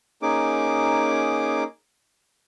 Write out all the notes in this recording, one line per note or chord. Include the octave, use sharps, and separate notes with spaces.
A#3 C#4 D#4 G#4 D6